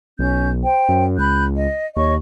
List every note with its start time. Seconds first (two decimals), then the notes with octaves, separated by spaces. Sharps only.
0.19 B1 C#4 G6
0.62 C5 G5
0.89 F#2
1.18 C#2 B5 F#6 G6
1.56 D#5
1.96 D#2 C#5 D#5 C#6